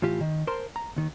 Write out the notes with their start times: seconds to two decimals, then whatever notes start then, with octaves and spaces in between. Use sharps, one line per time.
0.02 A2 E3 F4 G4
0.21 D#3
0.47 A#4 C5 A5 A#5 C6
0.76 A#5
0.96 D#2 D#3